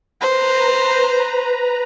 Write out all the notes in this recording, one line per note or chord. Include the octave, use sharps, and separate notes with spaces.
B4 C5 A#5